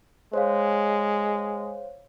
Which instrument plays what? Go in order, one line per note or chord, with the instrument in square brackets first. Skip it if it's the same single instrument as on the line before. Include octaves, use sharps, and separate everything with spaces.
[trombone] G#3 [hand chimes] C5 C#5 F5